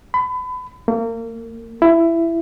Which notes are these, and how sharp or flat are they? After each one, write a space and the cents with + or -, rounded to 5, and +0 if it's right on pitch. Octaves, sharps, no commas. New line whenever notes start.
B5 +30
A#3 -30
E4 +15